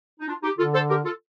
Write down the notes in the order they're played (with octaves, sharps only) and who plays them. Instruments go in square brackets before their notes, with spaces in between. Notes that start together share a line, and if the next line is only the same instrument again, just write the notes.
[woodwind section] D#4
D4 F4
D#4 G4
[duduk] D3 [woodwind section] F4 A4
[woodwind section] A4 C5
G4 A#4
F4 A4